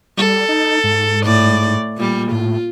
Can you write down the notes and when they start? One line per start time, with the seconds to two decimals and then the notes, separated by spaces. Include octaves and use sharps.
0.18 G3 A4
0.49 D#4
0.84 G#2
1.24 A2 D5
1.97 A#2 G3
2.32 A2 F4